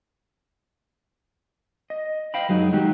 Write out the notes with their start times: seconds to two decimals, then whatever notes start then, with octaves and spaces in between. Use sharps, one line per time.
1.90 D#5
2.34 C5 D#5 F5 G5 B5
2.49 F#2 F#3 G#3 D#4
2.73 D#3 F#3 G#3 D#4 F#4 G4